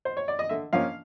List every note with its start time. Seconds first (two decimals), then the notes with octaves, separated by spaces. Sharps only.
0.05 C5
0.17 C#5
0.28 D5
0.39 D#5
0.49 D3 E5
0.73 F3 A#3 C#4 F5